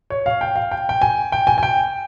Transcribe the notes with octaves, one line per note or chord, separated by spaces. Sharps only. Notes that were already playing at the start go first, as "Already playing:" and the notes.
C#5
F5
G5
F5
G5
G5
G#5
G5
G#5
G#5
G5